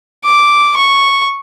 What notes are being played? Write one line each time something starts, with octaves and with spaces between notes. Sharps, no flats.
D6
C#6